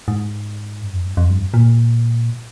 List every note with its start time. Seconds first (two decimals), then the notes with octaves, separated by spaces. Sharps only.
0.08 G#2
0.81 G2
0.93 F2
1.05 G2
1.17 F2
1.30 G2
1.54 A#2